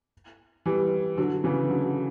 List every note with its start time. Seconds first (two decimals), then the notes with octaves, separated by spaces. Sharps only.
0.66 E3 G3
1.18 D3 F#3
1.44 C#3 E3
1.70 D3 F#3